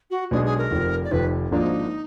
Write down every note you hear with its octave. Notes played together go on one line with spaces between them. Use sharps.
F#4
B1 B2 G#3 D4 G#4
G#4
A#4
F1 F2 D#3
D5
F1 F2 D#3 B4
G#1 G#2 F3 A#3 D4 D#4